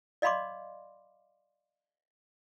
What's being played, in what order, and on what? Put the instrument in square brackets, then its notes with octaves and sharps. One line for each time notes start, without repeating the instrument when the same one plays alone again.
[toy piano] D5 D#5 F5 B5 C6 D6